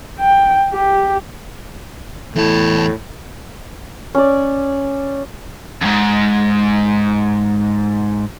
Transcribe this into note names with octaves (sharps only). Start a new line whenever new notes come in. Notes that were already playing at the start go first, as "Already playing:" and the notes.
G5
G4
E2 A2 A5
C#4 D5
F2 G#2